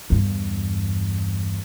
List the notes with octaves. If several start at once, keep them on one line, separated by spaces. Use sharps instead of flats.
E2 G2